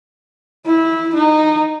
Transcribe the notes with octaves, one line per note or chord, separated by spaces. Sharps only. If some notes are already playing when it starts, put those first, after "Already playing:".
E4
D#4